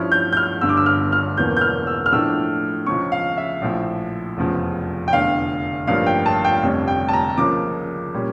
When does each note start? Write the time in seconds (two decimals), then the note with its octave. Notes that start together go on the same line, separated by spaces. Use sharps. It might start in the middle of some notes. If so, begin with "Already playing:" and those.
Already playing: G2 F3 C#4 E4 F6
0.12 G6
0.33 G6
0.37 F6
0.61 G1 G2 D3 E6
0.69 D6
0.77 E6
0.86 F6
1.12 F6
1.37 E1 E2 E3 A#3 C#4 G6
1.57 G6
1.61 F6
1.87 E6
2.06 F6
2.12 A2 F3 A3 D4 E6
2.87 C#2 C#3 F3 C#4 C#6
3.12 F5
3.37 E5
3.62 A#1 A2 F3
4.37 F1 E2 C#3 F3
5.08 G5
5.13 F1 E2 D3 F5
5.87 A1 G2 F3 A#3 F5
6.06 G5
6.26 A5
6.45 G5
6.63 F1 F2 D3 G3 C#4
6.88 G5
7.09 A5
7.13 A#5
7.37 C#2 C#3 F3 A#3 D6
8.14 A#2 G3 C#4